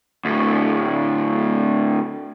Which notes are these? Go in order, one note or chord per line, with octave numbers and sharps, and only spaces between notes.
D2 A2